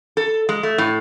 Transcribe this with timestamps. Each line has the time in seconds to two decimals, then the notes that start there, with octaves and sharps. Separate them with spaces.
0.17 A4
0.49 G#3
0.63 A3
0.78 A2